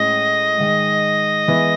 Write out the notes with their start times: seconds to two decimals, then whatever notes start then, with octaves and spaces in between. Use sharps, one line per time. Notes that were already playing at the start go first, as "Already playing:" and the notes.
Already playing: A2 G#3 C#4 D#5
0.57 G#2 D#3 G#3
1.48 E3 G#3 B3 E4